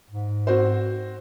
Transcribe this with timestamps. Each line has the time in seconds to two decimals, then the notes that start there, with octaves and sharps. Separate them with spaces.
0.11 G#2
0.47 C4 F#4 C5